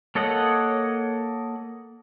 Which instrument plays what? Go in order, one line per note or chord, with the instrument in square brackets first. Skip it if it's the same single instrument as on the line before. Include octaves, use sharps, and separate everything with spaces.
[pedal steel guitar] A#3 A4 C#5 D#5 F#5